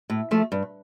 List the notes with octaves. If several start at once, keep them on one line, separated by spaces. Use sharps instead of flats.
A2
F3 A3
G2